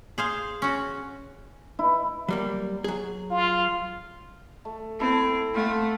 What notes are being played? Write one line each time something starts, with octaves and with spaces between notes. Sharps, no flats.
G#4 C5 F5
C#4 F#4
E4
F#3 G3 A#3
F#3 G#4
F4
A3
C4 E4 A4
A3 C4 F5 F#5